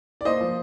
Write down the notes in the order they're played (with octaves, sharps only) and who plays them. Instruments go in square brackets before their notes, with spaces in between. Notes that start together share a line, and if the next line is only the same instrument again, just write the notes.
[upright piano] D5
A#3 C5 D#5
F3